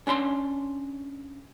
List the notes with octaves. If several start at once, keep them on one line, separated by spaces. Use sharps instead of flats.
C#4 D4 B5 C6